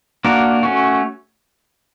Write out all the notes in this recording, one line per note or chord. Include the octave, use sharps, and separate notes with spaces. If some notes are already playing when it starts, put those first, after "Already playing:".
A#3 D4 F#4 A#4
A3 C#4 F#4